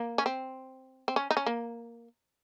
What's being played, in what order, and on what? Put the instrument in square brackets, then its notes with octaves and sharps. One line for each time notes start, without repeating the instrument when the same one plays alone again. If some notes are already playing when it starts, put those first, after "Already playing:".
Already playing: [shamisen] A#3
C#4
C4
C4
C#4
D#4
C#4
A#3